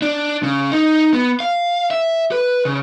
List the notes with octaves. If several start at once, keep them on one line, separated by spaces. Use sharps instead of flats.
D4
C#3
D#4
B3
F5
E5
B4
C#3